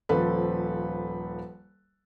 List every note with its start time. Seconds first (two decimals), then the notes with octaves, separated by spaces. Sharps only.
0.09 D#1 F3 A4 B4